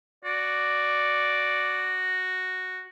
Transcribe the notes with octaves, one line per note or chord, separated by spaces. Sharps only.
F#4 D5